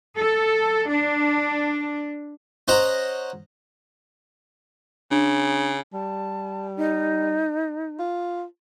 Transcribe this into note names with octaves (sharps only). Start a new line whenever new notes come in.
A4
D4
C#4 C5 D#5 F#5 A#5
C#3 D4
G3 A5
D#4
F4